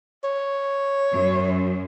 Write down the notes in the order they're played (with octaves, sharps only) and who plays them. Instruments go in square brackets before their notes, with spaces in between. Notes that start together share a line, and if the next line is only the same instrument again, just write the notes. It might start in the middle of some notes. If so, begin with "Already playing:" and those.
[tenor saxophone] C#5
[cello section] F#2